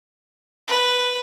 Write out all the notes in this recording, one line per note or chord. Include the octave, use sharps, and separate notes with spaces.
B4